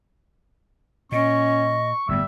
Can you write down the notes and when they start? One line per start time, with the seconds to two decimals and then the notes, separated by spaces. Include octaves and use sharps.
1.12 A#2 C#4 D#5 C#6
2.09 G1 A2 G3 B3 E5